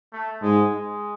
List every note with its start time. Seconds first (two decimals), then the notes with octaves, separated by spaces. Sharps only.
0.12 A3
0.42 G#2 G#3
0.72 G#3